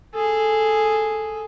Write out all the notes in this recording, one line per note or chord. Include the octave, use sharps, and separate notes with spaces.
G#4 A4